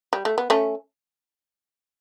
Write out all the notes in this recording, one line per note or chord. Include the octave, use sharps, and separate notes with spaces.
G3
A3
B3
A3 C#4